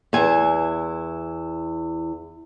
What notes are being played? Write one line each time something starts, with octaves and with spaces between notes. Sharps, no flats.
E2 E4 G#5